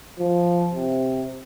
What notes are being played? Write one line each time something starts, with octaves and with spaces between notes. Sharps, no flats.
F3
C3